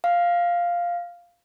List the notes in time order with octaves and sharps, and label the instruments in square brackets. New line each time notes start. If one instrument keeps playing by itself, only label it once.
[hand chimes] F5